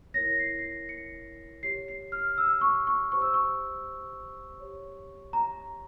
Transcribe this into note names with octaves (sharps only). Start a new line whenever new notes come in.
E4 A#4 C#5 A#6
C7
C7
A#6
C#7
G4 C#5 C7
C7
F6
E6
C#6
C#6
G4 C5 C#6
E6
C#6
G4 C#5
A#5